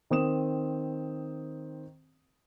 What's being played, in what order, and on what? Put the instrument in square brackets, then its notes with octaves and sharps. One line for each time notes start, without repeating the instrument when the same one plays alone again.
[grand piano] D#3 C4 D#6 E7